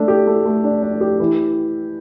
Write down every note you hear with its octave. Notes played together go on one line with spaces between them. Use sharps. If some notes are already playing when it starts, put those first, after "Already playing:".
Already playing: A3 D4
G4
A3
A3
D4
D4
G4
E3